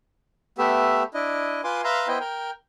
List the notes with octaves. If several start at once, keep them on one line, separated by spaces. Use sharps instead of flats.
A3 B3 G4 E5
D4 E4 D#5
F4 B4 G#5 C6 D6
B4 E5 F5 A#5 C6
B3 E4 C5 D#5 G5
A#4 G5